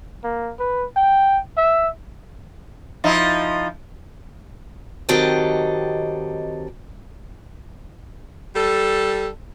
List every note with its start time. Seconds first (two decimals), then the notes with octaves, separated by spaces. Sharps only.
0.24 A#3
0.59 B4
0.96 G5
1.57 E5
3.04 F3 D#4 E4
5.09 D#3 F#3 C4 G4 A4 D#5
8.55 G3 A4